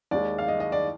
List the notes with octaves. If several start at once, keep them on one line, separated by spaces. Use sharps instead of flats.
D#2 D#3 G#3 D5
F5
D#5
D#5
D5